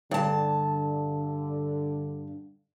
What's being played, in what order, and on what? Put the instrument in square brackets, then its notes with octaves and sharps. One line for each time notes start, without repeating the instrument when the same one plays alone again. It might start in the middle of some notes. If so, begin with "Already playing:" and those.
[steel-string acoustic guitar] G2 A5 [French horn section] D3